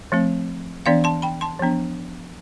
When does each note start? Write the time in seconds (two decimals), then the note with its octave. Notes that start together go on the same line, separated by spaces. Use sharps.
0.12 F3 A3 C4
0.86 E3 B3 D4 D5 F5
1.04 A5 C6
1.22 G5 B5
1.41 A5 C6
1.59 F3 B3 D4